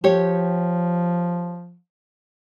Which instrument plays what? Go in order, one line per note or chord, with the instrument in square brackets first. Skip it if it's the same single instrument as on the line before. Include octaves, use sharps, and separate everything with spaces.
[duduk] F3 [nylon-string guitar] G4 C#5